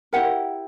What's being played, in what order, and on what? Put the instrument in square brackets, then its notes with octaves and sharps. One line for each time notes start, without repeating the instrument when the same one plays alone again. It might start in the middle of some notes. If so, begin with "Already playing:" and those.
[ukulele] E4 G4 A#4 F#5